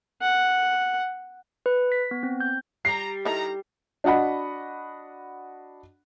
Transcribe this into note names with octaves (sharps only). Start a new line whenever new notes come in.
F#5
B4
B6
B3
C4
G6
G3 A#5 C7
D#3 D#4 E4 A4 A#5
D4 F#4 D#5 F#5 B5